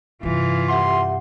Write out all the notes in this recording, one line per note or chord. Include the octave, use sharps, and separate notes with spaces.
G2 C3 E3 F4
G4 E5 F#5 C6